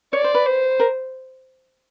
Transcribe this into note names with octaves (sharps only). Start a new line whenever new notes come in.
C#5 D5
C5
B4
C5
A#4